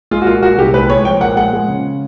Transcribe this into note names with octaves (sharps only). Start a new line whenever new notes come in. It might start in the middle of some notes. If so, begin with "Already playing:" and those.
G#3 F4
F#4
A#2 F4
A#2 F#4
C2 G4
G#3 B4
G#3 C#5
F3 G5
A#2 F#5
G#3 F#5
G#3
C#3